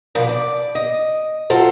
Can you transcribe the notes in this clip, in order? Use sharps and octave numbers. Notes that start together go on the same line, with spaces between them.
B2 F3 A#4 B4 D5
D5
D#5
F#3 F4 A4 C5